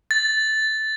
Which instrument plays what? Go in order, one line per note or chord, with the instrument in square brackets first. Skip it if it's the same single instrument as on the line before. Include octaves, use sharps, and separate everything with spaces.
[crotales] A6